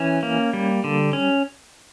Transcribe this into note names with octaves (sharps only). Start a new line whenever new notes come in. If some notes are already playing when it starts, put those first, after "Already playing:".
Already playing: E3 C#4
A#3
G3
D3
C#4